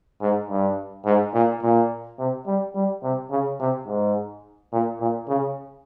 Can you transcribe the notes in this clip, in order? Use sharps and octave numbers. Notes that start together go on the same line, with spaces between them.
G#2
G2
G#2
A#2
A#2
C3
G3
G3
C3
C#3
C3
G#2
A#2
A#2
C#3